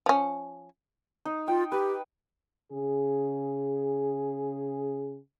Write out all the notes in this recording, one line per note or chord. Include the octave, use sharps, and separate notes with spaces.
F3 C#4
D#4
F4 G5
G4 B4
C#3 G#4